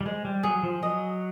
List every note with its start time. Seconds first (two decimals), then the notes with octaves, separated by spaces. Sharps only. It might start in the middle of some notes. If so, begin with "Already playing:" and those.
0.01 G3
0.06 G#3 C5
0.25 G3
0.43 F#3 G#4
0.63 F3
0.82 F#3 D#5